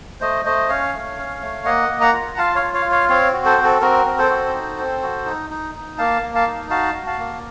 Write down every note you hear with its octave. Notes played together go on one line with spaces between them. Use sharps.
A3 C5 D#5
A3 C5 D#5
C#4 C#5 F5
A3
C#4
A3
A#3 D#5 F#5
A#3
F#5 A#5
F4
F4 F5 A5
C#5 F5
F4
C#5 F5
F4
C#5 F5
C4 C#5 F5
F#4
A4 C5
C4
A4
C4 F#4 A#4
C4
A4 C5
F#4
D#4
C4
F#4
D#4
D#4
D#4
A#3 F5 A5
A#3
F5 A5
D#4
F#4 F5 A5
F#4
F5 A5
A#3